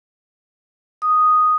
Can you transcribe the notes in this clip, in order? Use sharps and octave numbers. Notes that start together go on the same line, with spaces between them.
D#6